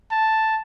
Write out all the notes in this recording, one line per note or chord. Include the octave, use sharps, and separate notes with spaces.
A5